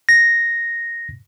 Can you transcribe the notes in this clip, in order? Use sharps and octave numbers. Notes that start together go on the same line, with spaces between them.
A#6